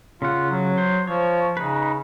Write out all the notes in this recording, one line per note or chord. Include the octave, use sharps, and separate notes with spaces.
C#3 F4 F#5
F#3
C5
F3 C#5
C#3 D#4 B4